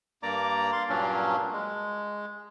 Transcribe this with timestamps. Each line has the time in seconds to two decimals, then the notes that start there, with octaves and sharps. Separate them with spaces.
0.23 G2 A#3 D5 A#5 D6
0.73 F5 C6
0.89 G2 A#2 F#3 A#3 C#4 D4
1.52 G#3